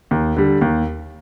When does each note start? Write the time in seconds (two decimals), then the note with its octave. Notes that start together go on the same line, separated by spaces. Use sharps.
0.11 D#2
0.37 D3 G3
0.61 D#2